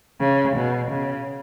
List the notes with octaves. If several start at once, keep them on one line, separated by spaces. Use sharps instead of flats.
C#3
B2
C#3